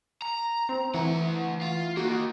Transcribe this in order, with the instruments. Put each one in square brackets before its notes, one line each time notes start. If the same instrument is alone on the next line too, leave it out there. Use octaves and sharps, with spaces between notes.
[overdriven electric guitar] A#5
[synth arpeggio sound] C4
[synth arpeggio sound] E3 [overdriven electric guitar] A3 F#5
[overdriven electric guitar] F4
[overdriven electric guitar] A#3 D#4 [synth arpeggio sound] F#4